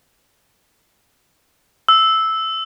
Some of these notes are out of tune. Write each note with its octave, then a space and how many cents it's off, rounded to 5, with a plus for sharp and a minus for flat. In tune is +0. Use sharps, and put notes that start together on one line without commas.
E6 -5